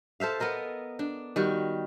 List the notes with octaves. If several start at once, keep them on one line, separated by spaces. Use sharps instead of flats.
A4 C5 E5 F5
B3 A4 A#4 D#5
D4
D#3 G3 F#4